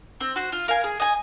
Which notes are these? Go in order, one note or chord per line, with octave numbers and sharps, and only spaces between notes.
C4
F#4 C5
F4
A#4 F5 G#5
G#4
D#5 G#5